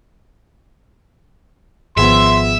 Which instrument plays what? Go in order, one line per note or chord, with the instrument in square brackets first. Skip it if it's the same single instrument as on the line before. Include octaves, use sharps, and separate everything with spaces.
[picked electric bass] G#1 [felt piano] F3 B3 G#4 [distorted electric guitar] E5 [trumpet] C6